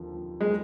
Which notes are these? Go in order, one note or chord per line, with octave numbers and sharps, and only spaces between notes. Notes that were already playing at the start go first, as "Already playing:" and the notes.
Already playing: D#2 D3 F3
F3
G#3